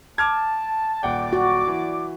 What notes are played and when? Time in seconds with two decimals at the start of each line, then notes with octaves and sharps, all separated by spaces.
0.18 A5 D6 F6 G#6
1.03 D#1 D5 F#5 G5 D6
1.33 F#4
1.67 E3